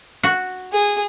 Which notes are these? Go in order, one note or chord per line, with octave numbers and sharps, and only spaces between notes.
F#4
G#4